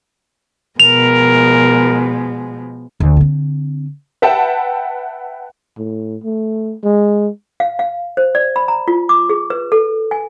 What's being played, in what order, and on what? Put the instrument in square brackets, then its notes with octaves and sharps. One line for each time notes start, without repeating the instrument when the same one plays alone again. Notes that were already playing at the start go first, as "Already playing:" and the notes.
[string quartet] B2 F3 G#3 [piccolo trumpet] A#4 [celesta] F7
[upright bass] D2
D3 C4
[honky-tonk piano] B4 E5 F#5 G5 A5
[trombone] A2
A3
G#3
[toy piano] F5
F5
C5
D5
B5
A#5
F4
D6
G#4
B4
A4
G#5